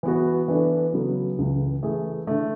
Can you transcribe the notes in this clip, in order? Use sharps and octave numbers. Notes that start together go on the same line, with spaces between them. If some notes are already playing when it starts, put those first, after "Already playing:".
E3 B3 F#4
E3 B3 D4 A4
C#3 F#3 B3 F#4 A4
C#2 C#3 E3
E3 A3 E4 G#4
D3 A3